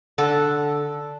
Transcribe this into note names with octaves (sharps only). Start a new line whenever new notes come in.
D3 A4 F#5